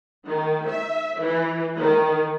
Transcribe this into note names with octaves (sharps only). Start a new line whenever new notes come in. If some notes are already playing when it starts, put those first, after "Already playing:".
D#3
E5
E3
D#3